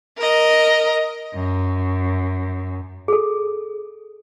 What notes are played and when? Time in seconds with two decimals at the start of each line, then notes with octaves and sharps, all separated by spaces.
0.17 A#4 D#5
1.34 F#2
3.08 G#4 A4